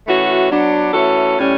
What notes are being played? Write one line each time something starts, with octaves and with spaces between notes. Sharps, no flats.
E3 A3 C#4 F#4
F#3 B3 D4
E3 A3 C#4 F#4 A4
A2 G3 C#4